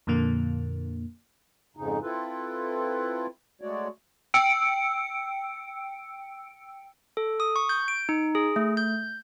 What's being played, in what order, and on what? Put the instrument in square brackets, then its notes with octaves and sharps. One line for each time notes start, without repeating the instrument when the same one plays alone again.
[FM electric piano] F2 A#2 D3 A#3
[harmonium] F2 G#2 C#3 D#4
C4 E4 F4 A4 B4
G#3 A3 F#4 C#5 D5
[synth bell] G5 E6 C#7 D7
[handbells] A4
D#6
C#6
G6
D7
D#4
G#4
A3
G6